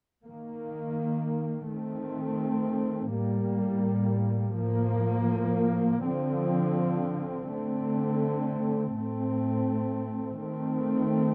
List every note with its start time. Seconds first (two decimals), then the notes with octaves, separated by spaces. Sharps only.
0.24 D#3 A#3
1.69 D#3 A3 C4
3.14 A2 G3 A#3
4.59 A2 F3 A#3
6.05 D3 F3 C4
7.50 D3 A3 C4
8.95 A2 A3 C4
10.40 D#3 A3 C4